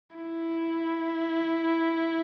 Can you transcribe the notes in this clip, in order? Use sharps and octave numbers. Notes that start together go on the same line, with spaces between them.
E4